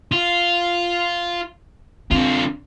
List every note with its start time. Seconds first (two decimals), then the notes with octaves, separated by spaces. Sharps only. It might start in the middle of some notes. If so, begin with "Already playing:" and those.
0.12 F4
2.11 D3 C4 F4